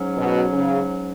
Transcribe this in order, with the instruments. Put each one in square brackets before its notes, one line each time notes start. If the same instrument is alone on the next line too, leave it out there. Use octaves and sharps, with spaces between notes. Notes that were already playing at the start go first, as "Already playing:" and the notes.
Already playing: [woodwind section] G#2 F#3 C#4
[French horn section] B2
C#3